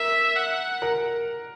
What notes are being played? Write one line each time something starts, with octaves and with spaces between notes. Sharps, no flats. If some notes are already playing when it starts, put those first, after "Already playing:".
Already playing: A#4 E5
F#5
A#4